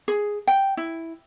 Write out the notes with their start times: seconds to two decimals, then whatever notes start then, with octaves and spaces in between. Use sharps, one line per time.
0.08 G#4
0.47 G5
0.77 E4